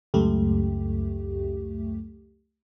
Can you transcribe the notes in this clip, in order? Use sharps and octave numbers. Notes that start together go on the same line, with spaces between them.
C#2 F#2 A3 G4